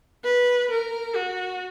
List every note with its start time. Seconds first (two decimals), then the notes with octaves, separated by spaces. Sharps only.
0.25 B4
0.71 A#4
1.15 F#4